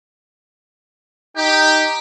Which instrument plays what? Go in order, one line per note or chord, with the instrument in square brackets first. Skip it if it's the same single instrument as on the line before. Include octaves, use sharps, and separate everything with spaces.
[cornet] D#4 [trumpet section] G4 [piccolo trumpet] G5